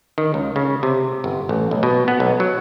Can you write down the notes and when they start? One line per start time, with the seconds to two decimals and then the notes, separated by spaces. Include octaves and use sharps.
0.18 D#3
0.34 C#2
0.56 C#3
0.83 C3
1.24 G1
1.49 A1
1.71 B1
1.83 B2
2.08 B3
2.20 B1
2.40 F#3